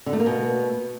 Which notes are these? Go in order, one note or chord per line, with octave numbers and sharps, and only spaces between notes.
D3
A3
A#3
B2